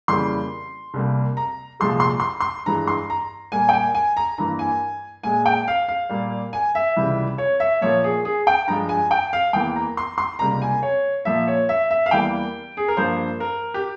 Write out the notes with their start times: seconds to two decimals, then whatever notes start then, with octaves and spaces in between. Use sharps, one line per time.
0.08 F2 C#3 E3 G3 A#3 C6
0.94 C2 C3 G3 A#3
1.37 A#5
1.80 C2 A#2 F3 G#3 C6
2.00 C6
2.20 C6
2.40 C6
2.66 G2 E3 G#3 A#5
2.87 C6
3.10 A#5
3.52 A#2 G3 A#3 G#5
3.69 G5
3.73 G#5
3.95 G#5
4.17 A#5
4.38 G2 E3 A#3 A#5
4.59 G#5
5.23 A#2 G#3 G#5
5.46 G5
5.68 F5
5.88 F5
6.10 A#2 G3 A#3
6.53 G#5
6.75 E5
6.96 C#2 C3 E3 G3
7.38 C#5
7.60 E5
7.81 A#2 F3 A#3 C#5
8.04 G#4
8.25 G#4
8.47 G5
8.67 G2 F3 G#3 A#5
8.89 G#5
9.11 G5
9.33 F5
9.53 E2 E3 A#3 G5
9.76 A#5
9.97 C6
10.18 C6
10.39 C#2 C3 G3 A#3 A#5
10.62 G#5
10.83 C#5
11.25 A#2 F3 A#3 E5
11.48 C#5
11.69 E5
11.91 E5
12.06 F5
12.11 E2 E3 G3 A#3 G5
12.77 G#4
12.88 A#4
12.97 G2 F3 A#3 C5
13.40 A#4
13.74 G4